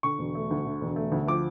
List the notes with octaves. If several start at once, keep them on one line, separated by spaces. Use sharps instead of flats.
D3 C#6
E1
A3
D2
D3
E1
A3
D2
F3 D6